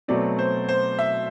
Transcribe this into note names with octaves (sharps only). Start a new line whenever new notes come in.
B2 F#3 A3 C4 D5
C5
C5
E5